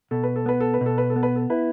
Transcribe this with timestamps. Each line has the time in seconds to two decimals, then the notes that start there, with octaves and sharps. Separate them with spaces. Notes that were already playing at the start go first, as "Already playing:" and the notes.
0.11 B2 A4
0.23 B4
0.36 A4
0.46 B3 B4
0.60 A4
0.74 B4
0.81 B2 A4
0.98 B4
1.10 A4
1.16 B3
1.23 B4
1.36 A4
1.50 E4 B4